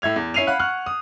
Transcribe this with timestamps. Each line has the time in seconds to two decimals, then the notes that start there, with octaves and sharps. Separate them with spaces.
0.02 A2 E5 G#6 F7
0.16 E2
0.34 C#4 E4 C7 D#7 F7
0.47 F5 F#5 B5 F#6
0.59 F#5 C#6 F6 F#6
0.86 D#6